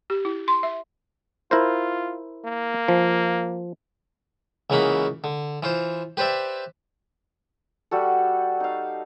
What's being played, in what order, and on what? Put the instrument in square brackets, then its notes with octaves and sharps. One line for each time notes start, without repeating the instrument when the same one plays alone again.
[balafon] G4
E4
C6
E5
[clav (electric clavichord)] E4 A#4 C5 [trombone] F4
[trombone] A#3
[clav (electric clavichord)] F3
[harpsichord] C#2 C#3 E3 A#3 F#4 B5
D3
E3 F4 C5
G4 B4 C5 D5 E5
[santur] G3 F#4 A4
D#4 F5